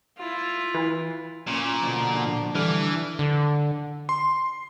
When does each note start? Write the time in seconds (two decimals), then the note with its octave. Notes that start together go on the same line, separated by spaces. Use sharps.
0.18 E4 F4
0.74 E3
1.47 A#2 C#4
1.80 B2 D3 F3
2.15 D4
2.55 D3 E3 G3 D4 F6
3.19 D3
4.09 C6